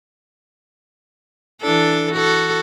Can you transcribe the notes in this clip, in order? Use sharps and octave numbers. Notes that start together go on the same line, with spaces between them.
E3 D4 A4
F#4 A4